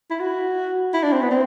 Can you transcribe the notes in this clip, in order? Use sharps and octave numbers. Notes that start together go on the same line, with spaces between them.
E4
F#4
E4
D4
C4
B3
C4